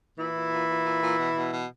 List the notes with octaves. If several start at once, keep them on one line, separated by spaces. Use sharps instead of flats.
A#2 E3 E4
A#2
A#2
A#2
A#2
A#2
B2
B2
B2